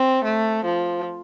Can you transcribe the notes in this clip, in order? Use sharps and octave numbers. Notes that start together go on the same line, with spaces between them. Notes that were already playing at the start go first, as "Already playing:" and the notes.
Already playing: C4
A3
F3